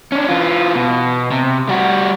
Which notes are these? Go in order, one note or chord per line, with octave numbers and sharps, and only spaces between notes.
C#4 D4
E3 F4
B2
C3
G3 F#4